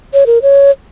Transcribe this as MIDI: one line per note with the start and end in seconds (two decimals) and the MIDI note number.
0.13 0.24 73
0.26 0.39 70
0.42 0.71 73